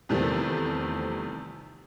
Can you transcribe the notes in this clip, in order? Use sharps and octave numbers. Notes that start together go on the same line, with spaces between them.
E2 C3 D#3 F3 G3 A3